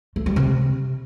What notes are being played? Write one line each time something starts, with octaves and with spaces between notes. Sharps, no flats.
A3
G3
C3